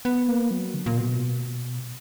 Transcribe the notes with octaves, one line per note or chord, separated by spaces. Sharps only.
B3
A#3
F#3
D3
A#2
B2